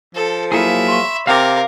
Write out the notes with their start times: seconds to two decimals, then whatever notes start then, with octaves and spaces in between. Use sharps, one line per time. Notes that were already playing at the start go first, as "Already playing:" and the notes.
0.15 F3 A4
0.52 F#3 A#3 E4 G#4 E5 B5 C#7
0.88 C6 C#6
1.27 C3 A#4 F5 G5 D6